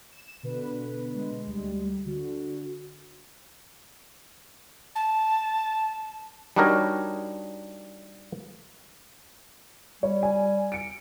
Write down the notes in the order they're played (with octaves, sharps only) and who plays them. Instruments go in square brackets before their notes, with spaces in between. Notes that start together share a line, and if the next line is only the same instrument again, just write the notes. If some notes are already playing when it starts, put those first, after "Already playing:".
[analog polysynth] E7
B2 D3 B4
[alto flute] G#3
[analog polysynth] D2 G3
[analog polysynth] D3 [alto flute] F#4
[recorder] A5
[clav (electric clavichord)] G3 D4 D#4 F#4 A#4 C#5
[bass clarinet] G3 [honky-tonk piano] C#5
[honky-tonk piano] G#5
C#7 D7